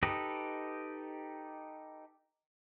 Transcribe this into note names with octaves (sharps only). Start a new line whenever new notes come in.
D#4 G4 A4 B4 D#5